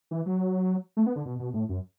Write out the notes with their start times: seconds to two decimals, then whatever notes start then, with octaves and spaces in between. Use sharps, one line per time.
0.11 E3
0.26 F#3
0.97 A3
1.06 B3
1.16 D3
1.25 B2
1.39 B2
1.54 A2
1.69 F#2